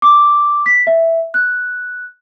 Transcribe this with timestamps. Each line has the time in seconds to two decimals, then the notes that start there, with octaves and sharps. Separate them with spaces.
0.02 D6
0.66 B6
0.87 E5
1.34 F#6